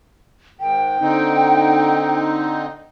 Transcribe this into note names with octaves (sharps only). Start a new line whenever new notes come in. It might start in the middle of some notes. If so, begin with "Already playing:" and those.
G#2 D#3 G5
D3 C4 D#4